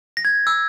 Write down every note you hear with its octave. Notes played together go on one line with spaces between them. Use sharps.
A#6
G#6
E6